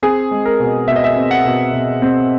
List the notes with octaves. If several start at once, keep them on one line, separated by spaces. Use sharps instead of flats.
C4 G#4
G#3
A#4
B2
B2 E5
D#5
E5
C4
F#5
B2
B2
C4